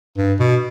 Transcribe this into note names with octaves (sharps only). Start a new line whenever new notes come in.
G2
B2